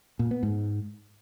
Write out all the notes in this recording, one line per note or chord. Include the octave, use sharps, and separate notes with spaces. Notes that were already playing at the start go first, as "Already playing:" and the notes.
A#2
B3
G#2